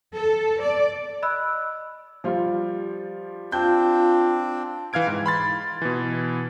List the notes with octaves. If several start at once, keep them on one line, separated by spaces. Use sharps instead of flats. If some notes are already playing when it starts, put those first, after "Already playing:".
A4
D5
D#5 B5 E6 F#6
F3 G3 F4
C4 D4 F4 G6
E3 F5 F6 G#6 D7
G#2
B5 C6 A6
B2 E3